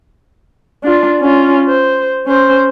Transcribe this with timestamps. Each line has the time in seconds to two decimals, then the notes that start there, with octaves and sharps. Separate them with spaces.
0.83 D4 F4
1.21 C#4 F4
1.68 C5
2.27 C#4 C5